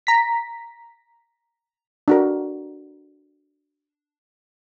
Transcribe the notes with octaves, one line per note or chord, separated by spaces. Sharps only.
A#5 B6
D4 F#4 A#4